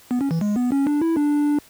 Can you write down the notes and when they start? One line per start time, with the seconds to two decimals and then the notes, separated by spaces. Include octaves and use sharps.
0.11 B3
0.21 C#4
0.31 E3
0.41 G#3
0.56 B3
0.72 C#4
0.87 D4
1.02 E4
1.17 D4